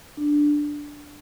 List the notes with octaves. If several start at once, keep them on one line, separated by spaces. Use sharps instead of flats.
D4